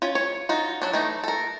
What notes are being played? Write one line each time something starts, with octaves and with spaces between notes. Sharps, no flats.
C#4 F4
C#5
D#4 F4 F#4
F#3 D4
E3 A3 D#4
A4 A#4